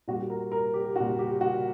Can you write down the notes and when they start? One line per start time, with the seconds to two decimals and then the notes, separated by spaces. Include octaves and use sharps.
0.08 A#2 G3 F#4
0.30 A#4
0.52 A#4
0.74 G4
0.96 A#2 G3 F#4
1.19 G4
1.41 F#4